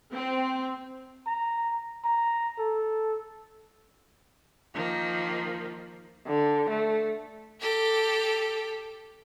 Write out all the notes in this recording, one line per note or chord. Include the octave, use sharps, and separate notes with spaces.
C4
A#5
A#5
A4
D#3 F3 A#3
D3
A3
G4 A4